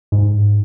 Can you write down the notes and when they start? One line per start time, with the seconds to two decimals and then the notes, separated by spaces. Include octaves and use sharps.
0.12 G#2